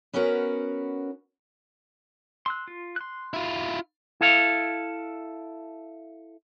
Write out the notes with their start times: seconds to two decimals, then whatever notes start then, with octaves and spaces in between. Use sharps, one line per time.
0.13 B3 C#4 F#4 A#4 B4
2.46 C6 E6 F#6
2.68 F4
2.96 C6 F#6
3.33 E4 F4
4.21 E4 A4 F5